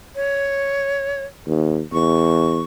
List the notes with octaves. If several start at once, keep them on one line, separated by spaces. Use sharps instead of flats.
C#5
D#2
E2 C#6